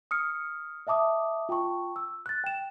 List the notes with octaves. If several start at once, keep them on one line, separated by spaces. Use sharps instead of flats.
D#6 F6 C#7
D#5 E5 A5 D6 D#6
F4 G5 A5 C#6
E6
F#6 A6
G5 E7